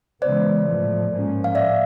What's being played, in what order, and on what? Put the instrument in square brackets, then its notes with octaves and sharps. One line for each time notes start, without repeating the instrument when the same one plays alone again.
[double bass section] C#3 E3 G#3 B3 [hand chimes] C5 D5
[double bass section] A2 F3 A3
G#2 F3 A#3 C#4
[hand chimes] F5
[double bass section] A2 [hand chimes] D5 E5